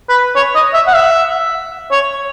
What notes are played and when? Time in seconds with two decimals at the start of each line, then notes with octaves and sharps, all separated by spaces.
0.09 B4
0.36 C#5
0.55 D#5
0.74 E5
0.87 F#5
0.94 E5
1.91 C#5